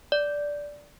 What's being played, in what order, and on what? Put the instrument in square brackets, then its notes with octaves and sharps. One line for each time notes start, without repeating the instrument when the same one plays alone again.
[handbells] D5